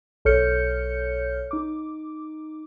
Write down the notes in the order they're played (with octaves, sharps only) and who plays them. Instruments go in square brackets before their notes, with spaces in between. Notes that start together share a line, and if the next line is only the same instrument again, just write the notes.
[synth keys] B1 A4 C#5 F6 G6 C#7
D#4 D6